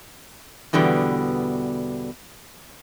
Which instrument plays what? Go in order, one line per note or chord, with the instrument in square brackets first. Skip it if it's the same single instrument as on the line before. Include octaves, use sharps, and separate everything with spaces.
[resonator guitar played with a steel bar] E2 B2 D3 G3 B3